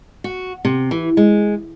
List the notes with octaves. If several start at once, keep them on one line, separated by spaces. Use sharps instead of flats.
F#4
C3
E3
G#3